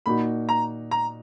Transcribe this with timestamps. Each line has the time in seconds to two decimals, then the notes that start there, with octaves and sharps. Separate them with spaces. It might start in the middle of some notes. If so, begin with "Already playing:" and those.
0.06 A#2 A#3 D#4 F#4 B5
0.49 A#5
0.91 A#5